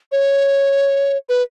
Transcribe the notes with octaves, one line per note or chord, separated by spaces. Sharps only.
C#5
B4